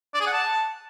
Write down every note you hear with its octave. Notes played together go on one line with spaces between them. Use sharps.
D5
G#4
F#5
A5